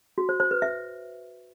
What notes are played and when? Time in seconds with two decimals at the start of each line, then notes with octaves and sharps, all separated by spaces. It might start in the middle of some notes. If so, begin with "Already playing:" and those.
0.18 F#4
0.29 C5
0.40 C5
0.51 B4
0.62 E5